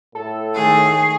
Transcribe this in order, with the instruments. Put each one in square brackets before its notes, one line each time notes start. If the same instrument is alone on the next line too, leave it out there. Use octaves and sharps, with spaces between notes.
[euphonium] A2 [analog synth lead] A4
[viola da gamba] D#3 A3 [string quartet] G#4